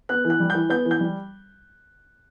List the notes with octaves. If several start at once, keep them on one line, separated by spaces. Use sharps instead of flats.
B3 F#6
E3
F#6
G3
E3 G6
B3 G6
E3
G6
G3